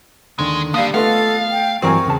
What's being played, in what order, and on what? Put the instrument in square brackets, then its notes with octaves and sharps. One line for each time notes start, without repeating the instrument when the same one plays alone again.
[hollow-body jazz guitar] D#2 D3 D#3 [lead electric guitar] G#3
[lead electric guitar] D3 [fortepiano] G3 D#6 [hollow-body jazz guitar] A#3 [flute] F5
[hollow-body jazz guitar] A3 D#5 C6 [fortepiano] B3 F4 [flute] A4 [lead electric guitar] F5
[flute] G5
[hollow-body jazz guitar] G2 E3 F#3 [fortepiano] C4 A#4 G#5 [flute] C#6
[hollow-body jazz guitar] E2 C#3 A5